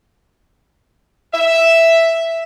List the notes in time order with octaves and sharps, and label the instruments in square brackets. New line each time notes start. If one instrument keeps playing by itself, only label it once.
[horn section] E5